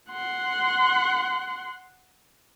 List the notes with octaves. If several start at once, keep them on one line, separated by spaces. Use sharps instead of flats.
F#5 C6